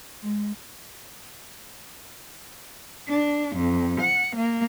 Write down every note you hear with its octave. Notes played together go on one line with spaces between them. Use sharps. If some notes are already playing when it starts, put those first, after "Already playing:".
G#3
D4
F2
F#5
A#3